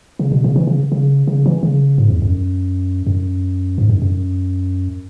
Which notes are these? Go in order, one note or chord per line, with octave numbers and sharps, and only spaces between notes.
C#3
B2
C#3
E3
C#3
C#3
C#3
E3
C#3
G#2
E2
F#2
F#2
G#2
F#2
F#2